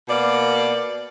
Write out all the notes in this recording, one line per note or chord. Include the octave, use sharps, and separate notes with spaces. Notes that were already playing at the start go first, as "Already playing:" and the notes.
B2 A#3 D5